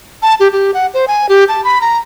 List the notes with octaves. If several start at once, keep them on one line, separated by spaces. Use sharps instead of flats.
A5
G4
G4
F#5
C5
G#5
G4
A5
B5
A#5